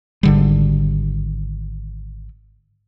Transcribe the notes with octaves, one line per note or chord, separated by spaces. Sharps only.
G#1 D3 G3